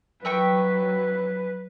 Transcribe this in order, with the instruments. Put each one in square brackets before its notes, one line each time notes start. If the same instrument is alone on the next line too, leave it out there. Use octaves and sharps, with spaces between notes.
[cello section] F#3 [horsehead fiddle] B4 [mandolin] E5 G5 C#6